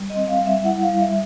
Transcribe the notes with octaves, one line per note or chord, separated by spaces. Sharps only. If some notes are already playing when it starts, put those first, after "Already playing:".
Already playing: G3
D#5
C4
F5
G3
E5
E4 F#5
F5
G3
E5